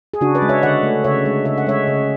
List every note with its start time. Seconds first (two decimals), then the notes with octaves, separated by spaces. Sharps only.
0.14 G#4
0.21 C#3 D4 F#4
0.35 B4 D5
0.42 G#3
0.49 C#5 E5
0.63 D3 D5 F#5
0.83 A3
1.04 C#3 C#5 E5
1.26 G#3
1.45 C#3 E5
1.58 F#5
1.67 G#3 C#5 E5
1.87 C#3